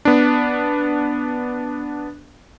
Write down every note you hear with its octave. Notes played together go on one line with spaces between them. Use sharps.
B3 D4